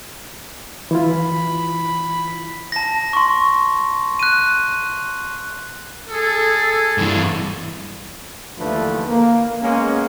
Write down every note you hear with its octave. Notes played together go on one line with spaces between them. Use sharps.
E3 E4 F4 B5
A5 A#6
C6 C#6
F#6 D#7
G#4 A4
G2 E3
D#2 D3 E3 F3 A3 B4
A#3
G#3 A#3 B3 C#4